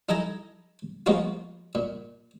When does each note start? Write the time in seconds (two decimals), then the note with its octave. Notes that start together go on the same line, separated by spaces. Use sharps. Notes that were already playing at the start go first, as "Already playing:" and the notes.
0.09 D#4 E4 A4 G#5 A#5
1.06 F3 G#3 A#3 B3 F4 F#4
1.75 A#2